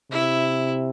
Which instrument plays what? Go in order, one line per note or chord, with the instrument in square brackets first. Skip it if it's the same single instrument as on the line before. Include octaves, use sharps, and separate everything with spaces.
[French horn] C3 [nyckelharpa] E4